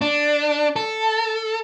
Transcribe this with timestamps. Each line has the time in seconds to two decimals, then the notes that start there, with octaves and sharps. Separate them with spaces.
0.01 D4
0.76 A4